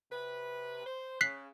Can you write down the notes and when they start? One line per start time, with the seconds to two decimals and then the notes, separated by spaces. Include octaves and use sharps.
0.11 C3 B4
0.86 C5
1.21 C#3 F#6 B6 C7